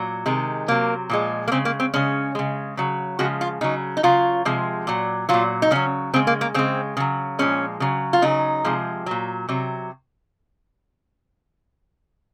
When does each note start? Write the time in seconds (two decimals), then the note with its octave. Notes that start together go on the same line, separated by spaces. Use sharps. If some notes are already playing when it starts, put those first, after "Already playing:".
Already playing: A#2 F#3
0.26 C3 D#3 G#3
0.68 C3 F#3 A#3
1.10 A#2 F3 G#3
1.48 A#3
1.52 C#3 G#3 C4
1.65 A#3
1.80 C4
1.94 C#3 G#3 C#4
2.35 C#3 G#3
2.77 C#3 F#3
3.19 C#3 F3 G#3 F#4
3.41 F4
3.61 C#3 F#3 D#4
3.97 D#4
4.03 C#3 F#3 F4
4.45 C3 F3 G#3
4.87 A#2 F#3
5.29 A#2 F#3 F4
5.62 D#4
5.71 C#3 F#3 C#4
6.14 C#3 G#3 C4
6.27 A#3
6.41 A#3
6.54 C#3 G#3 C4
6.97 C#3 F#3
7.39 A#2 F3 G#3 C#4
7.80 C#3 F#3
8.13 F4
8.22 C#3 F#3 D#4
8.64 C3 F3 G#3
9.06 A#2 F#3
9.49 C3 F#3